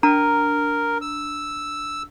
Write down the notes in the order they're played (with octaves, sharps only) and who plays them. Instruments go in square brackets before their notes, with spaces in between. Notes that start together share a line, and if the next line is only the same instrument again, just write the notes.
[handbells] D4 A#5 [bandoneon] A#4
[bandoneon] E6